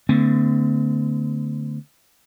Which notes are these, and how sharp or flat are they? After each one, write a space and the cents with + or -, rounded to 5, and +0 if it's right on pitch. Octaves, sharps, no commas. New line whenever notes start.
D3 +0 A3 +25 C4 -45